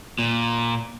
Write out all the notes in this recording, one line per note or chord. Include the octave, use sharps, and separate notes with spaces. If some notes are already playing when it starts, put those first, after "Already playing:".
A#2